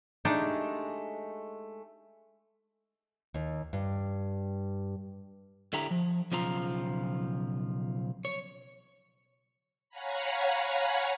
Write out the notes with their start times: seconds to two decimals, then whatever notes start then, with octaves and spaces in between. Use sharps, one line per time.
0.25 G#3 A3 D4 D#4 G4
3.34 D#2
3.73 G2
5.73 D3 E4 G4 A#5
5.91 F3
6.32 B1 C#3 F3 F4 A#5
8.25 C#5
9.89 C#5 F5 F#5 G#5 A#5 B5